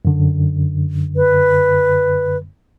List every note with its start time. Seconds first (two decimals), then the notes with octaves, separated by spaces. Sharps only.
0.05 F#2 D3
1.16 B4